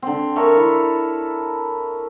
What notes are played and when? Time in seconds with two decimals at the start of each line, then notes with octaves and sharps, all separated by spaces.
0.02 D3 C4
0.36 A4 A#4 C#5 E5
0.57 E4